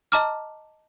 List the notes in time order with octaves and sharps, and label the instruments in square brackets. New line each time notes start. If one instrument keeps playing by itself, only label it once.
[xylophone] D#5 A5 A#5 D6 F6